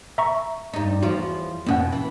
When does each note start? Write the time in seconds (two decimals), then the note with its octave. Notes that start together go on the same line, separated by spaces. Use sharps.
0.18 E5 A#5 C#6
0.73 G2 D#4
1.02 E2 F3 F4 F#4
1.66 F2 B2 A#3 C#4 F#5
1.92 E3